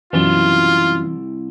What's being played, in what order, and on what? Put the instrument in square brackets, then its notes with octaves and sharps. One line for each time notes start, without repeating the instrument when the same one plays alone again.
[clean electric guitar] C2 E4 C6 [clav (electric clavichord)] F#2 B2 [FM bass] E3 [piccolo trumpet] F4